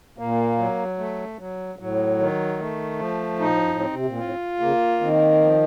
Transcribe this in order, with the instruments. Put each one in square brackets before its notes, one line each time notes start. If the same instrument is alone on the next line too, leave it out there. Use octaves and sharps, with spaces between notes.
[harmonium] A#2 [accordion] A#3
[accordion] F#3
A3
F#3
[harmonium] A2 [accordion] F#3
[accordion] D#3
A3
F3
[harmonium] A#2 [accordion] D#4
[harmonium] A2
F#2
A2
[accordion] C4
[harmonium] C3
A#2
[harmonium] A2 [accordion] F4
[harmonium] C#3 [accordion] A#3
[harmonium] D#3 [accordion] C4
[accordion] F3